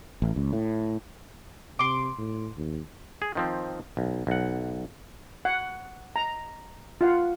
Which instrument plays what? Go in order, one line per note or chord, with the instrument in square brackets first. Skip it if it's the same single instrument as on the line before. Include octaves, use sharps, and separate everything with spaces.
[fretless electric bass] A1
C#2
A2
[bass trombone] C3 [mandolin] C6 D6
[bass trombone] A2
D#2
[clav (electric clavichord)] G#4
D#3 F3 C4
B1
B1 F#5
[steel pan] F#5
A#5
F4 F5 F#5